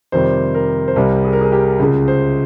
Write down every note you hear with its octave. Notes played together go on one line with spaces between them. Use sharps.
F2 C3 D#3 G3 C5
A#4
C5
C2 C3 G3 A#4
G#4
A#4
G#4
G4
C#2 C#3 G#3
C5